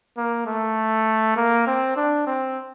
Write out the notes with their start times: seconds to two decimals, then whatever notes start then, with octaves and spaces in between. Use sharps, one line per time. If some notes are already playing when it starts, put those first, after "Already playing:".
0.17 A#3
0.46 A3
1.36 A#3
1.66 C4
1.96 D4
2.27 C4